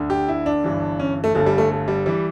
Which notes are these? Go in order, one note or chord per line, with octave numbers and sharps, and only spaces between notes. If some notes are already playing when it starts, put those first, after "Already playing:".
Already playing: D2 D3
G4
E4
D4
G1 G2 E3
C#4
A3
G1 G2 D3 A3
G3
A3
A3
G3
E3 G3